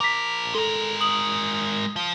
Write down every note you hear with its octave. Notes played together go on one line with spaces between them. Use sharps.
F3 A#4 D6 B6
G#3 A4 A#4
D#6 F#7
F3